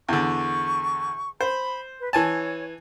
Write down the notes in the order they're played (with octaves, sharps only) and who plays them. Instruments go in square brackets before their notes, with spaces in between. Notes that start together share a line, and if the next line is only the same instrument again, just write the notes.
[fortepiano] E2 D3 [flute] C#6
[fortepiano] C5 [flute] B5
[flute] B4
[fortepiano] E3 G#5 A5 [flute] C#5